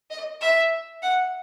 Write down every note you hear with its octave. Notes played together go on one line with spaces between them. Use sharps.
D#5
E5
F#5